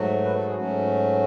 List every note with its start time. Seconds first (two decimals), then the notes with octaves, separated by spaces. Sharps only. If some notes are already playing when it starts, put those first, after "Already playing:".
Already playing: G#2 F#3 A3 F#4
0.24 B4
0.35 A4
0.45 G#4
0.56 G#2 F#3 A3 C#4 F#4